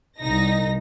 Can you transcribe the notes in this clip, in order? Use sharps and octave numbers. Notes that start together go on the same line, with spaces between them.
C2 D#4 A#6